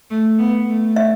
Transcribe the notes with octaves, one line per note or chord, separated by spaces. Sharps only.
A3
B3
A3
E5